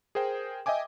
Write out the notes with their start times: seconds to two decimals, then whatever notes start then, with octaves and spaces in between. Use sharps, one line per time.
0.15 G#4 A#4 C5 G5
0.66 D#5 E5 G5 G#5 D6